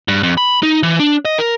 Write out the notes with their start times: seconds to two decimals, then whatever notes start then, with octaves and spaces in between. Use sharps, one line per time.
0.08 G2
0.23 F2
0.37 B5
0.63 D#4
0.83 E3
0.99 D4
1.25 D#5
1.38 A#4